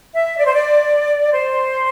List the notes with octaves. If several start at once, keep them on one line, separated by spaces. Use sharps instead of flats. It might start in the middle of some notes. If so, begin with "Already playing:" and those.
E5
D5
C5
D5
C5